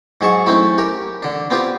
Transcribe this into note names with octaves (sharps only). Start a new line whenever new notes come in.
G#2 F#3 G#4 A5 C#6
A3 C4 C#4 E4
G4 A#4
D3 D4
B3 C4 F4 G4